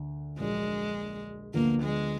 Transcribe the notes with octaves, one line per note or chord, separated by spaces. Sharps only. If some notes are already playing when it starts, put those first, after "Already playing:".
Already playing: D2 D3
A#1 A#2 F#3 G#3 D4
D2 D3 F3 A#3 B3
G#3